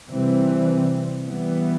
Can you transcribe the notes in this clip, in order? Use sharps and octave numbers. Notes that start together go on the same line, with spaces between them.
C3 E3 G3 C4
E3 G3 B3